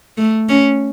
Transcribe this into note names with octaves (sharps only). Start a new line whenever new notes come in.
A3
C#4